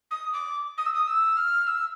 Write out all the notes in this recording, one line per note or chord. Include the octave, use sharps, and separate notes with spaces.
D#6
D6
D#6
E6
D#6
E6
F6
E6